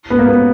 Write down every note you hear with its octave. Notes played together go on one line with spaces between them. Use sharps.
B3
A#3
B3